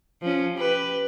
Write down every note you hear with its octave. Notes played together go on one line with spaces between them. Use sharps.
F3 C#4
G4 B4